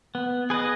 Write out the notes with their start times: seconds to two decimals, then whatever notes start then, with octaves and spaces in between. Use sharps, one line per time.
0.15 B3
0.50 G#4 B4 D#5